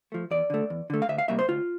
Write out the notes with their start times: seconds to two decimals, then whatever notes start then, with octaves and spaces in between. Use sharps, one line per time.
0.12 F3 A3
0.31 E2 D5
0.50 D3 A3
0.70 E2
0.90 D3 A3
1.02 F5
1.09 D2 E5
1.18 F5
1.28 C3 G3 A#3 E5
1.39 C5
1.48 D2 F4